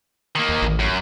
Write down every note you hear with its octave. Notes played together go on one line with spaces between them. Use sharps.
D#3 A#3
D#2
A1
F#2